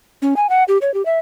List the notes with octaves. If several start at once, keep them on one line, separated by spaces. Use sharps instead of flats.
C#4
G#5
F#5
G4
C#5
G4
E5